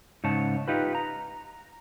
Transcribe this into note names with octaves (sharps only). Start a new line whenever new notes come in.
G#2 C#3 C#5 A5
D#4 F4 G4 B4
A#5